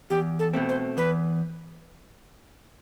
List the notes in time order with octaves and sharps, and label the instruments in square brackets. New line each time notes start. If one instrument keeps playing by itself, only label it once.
[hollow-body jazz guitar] E2 [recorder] G4
[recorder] A4
[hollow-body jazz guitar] B2 A3 C4
[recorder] C5
[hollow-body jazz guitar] E2 [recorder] B4